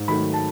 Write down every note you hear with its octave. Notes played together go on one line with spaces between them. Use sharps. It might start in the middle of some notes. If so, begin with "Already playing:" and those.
Already playing: G#2
D#3 F#3 A3 B5
A5